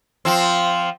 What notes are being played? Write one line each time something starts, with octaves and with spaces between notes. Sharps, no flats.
F3 C4